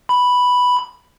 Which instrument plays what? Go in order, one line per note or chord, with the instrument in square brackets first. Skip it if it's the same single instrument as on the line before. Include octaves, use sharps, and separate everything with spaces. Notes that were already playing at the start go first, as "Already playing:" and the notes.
[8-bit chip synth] B5